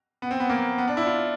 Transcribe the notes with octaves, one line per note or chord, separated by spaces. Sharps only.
B3
C4
B3
A#3
B3
D4
E4
F4